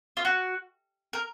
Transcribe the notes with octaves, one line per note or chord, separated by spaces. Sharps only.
F4
F#4
A#4